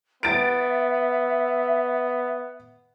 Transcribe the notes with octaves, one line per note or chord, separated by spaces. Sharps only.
B3 E5 A6 D7